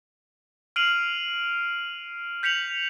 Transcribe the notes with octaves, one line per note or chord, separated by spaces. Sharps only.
F6 C7 D7 D#7 F7 F#7
G6 B6 C#7 F7 F#7